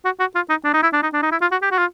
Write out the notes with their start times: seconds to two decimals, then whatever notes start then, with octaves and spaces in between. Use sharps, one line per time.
0.05 F#4
0.20 F#4
0.35 F4
0.50 D#4
0.65 D4
0.74 D#4
0.83 E4
0.93 D4
1.03 D#4
1.13 D4
1.23 D#4
1.32 E4
1.42 F4
1.52 F#4
1.62 G4
1.72 F#4
1.78 F4